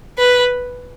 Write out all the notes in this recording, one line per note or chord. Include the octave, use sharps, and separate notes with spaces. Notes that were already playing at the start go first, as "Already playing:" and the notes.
B4